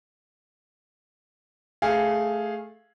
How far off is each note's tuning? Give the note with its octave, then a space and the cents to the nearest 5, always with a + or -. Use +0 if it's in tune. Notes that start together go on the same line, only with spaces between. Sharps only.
A3 -10 G#4 +0 F5 +0